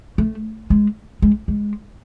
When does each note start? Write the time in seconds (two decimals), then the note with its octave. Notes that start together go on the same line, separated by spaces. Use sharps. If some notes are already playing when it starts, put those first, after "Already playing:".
0.18 A3
0.70 G#3
1.22 G#3
1.48 G#3